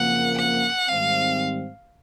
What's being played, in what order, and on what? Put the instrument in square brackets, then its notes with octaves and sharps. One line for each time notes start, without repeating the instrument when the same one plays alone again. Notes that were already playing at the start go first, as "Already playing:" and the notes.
Already playing: [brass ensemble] F#1 F2 C#3 F3 A#3 [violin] F#5
[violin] F#5
[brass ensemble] G#2 D#3 G3 C4 [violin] F5